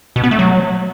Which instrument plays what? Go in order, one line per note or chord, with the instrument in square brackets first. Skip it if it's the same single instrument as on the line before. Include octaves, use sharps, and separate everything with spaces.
[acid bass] B2
B3
A3
F#3